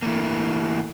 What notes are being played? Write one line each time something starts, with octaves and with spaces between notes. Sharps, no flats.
E3 A3 A#3